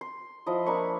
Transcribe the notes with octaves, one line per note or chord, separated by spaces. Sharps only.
C6
F3 E4 D#5
A#3 D4 B5 C#6